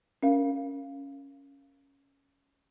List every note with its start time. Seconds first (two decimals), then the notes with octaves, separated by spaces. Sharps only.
0.23 C#4 A#4 F5